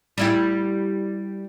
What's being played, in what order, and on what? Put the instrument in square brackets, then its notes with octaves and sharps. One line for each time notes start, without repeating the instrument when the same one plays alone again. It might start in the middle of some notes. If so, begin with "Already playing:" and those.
[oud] G3 E4 G4